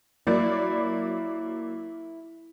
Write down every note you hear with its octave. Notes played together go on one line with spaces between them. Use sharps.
F#3 A#3 E4 D5